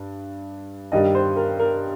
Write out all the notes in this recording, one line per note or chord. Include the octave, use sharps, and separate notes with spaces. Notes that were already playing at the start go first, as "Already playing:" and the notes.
Already playing: G2
G2 D#3 G3 D#5
C5
A#4
A#4